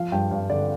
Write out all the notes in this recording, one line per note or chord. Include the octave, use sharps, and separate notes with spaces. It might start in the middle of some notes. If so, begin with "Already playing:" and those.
Already playing: F3 F5
G2 G5
G2 F5
D3 D5